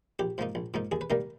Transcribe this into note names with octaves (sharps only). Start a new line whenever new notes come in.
A#1 G4
G#2 F3 A#3 D#4
A#1
G#2 F3 A#3 D#4
D#2 G#4
B4
D#3 G3 A#3 D#4 A#4